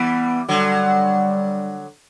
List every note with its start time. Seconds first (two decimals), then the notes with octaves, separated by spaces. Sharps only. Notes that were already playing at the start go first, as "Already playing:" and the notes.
Already playing: E3 G3 B3
0.48 D3 F#3 G3